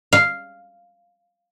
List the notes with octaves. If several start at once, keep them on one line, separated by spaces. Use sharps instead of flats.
F5